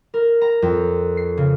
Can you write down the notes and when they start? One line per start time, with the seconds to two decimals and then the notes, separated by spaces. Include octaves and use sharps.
0.14 A#4
0.41 A#5
0.62 F2
1.17 C7
1.37 C#3